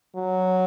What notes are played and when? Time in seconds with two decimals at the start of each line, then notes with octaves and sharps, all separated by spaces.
0.16 F#3